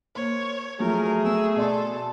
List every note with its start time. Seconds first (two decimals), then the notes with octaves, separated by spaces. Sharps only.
0.15 A#3 C5 C#5
0.80 F3 F#3 A3 G#4 A#4
1.25 B3 E6
1.56 B2 A4 D5 C6